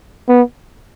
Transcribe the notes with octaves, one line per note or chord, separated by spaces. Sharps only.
B3